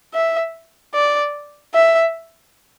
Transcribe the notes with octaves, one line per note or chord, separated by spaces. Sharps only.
E5
D5
E5